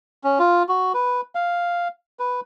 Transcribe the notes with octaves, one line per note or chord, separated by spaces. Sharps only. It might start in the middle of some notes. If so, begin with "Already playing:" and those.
C#4
F4
F#4
B4
F5
B4